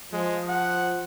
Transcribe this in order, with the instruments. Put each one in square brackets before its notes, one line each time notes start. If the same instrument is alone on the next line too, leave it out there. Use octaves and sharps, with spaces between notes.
[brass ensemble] F3 [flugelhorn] G#3
[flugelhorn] F#5